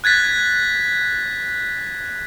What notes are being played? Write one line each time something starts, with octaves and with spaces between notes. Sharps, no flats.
F#6 G#6 A6 B6